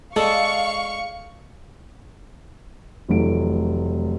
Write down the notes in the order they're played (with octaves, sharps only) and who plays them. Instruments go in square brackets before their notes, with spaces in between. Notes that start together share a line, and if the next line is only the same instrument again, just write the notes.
[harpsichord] G#3 D4 [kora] A4 [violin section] F5 C#6
[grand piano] F1 E3 F#3 A3 D7